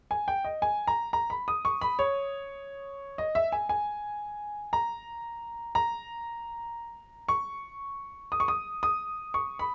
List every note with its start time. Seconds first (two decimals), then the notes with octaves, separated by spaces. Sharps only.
0.11 G#5
0.28 G5
0.44 D#5
0.62 G#5
0.87 A#5
1.13 A#5
1.30 B5
1.48 D#6
1.65 C#6
1.81 B5
1.99 C#5
3.18 D#5
3.35 E5
3.52 G#5
3.69 G#5
4.73 A#5
5.75 A#5
7.28 C#6
8.32 D#6
8.40 C#6
8.48 D#6
8.83 D#6
9.34 C#6
9.59 B5